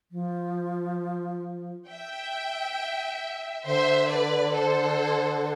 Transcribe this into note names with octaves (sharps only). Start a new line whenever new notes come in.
F3
E5 G5
D3 C5 E5
B4 D5
A4 C5